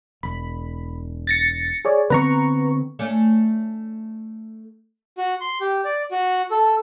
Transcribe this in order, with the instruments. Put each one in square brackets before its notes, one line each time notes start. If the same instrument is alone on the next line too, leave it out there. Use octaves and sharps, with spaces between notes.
[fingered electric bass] E1 [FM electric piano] B5
[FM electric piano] A6 A#6 C#7
G#4 C#5 D5
[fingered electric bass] D3 B3 C4 [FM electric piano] B4 A#5 C#6
[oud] A3 C#4 D4
[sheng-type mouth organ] F#4
C6
G4
D5
F#4
A4